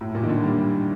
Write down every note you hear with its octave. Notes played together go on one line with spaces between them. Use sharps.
A2
A#2
D#3
D3
G3